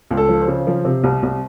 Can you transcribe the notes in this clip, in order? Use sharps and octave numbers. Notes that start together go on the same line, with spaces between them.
C#2
A4
F3
C5
C#3
F3
C3
C2
C2